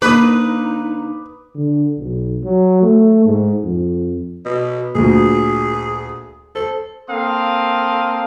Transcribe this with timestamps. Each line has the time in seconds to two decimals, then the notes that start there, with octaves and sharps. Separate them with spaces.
0.02 D3 A#3 D#4 B4 D6 D#6
1.55 D3
1.99 B1
2.44 F#3
2.82 A3
3.26 G#2
3.64 F2
4.45 B2
4.95 D2 A#2 G#4
6.55 A4 C5
7.09 A#3 C4 A4 F5 C6 D#6